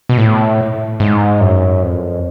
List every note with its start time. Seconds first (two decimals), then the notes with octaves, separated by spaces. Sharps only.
0.09 B2
0.18 A2
1.00 G#2
1.41 F#2
1.83 F2